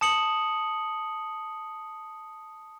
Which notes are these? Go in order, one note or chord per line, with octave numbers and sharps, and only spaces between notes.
A5 D#6 C#7 F#7